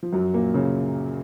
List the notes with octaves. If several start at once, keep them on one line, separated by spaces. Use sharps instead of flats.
F3
F#2 F#3
A#2 A#3
C#3 C#4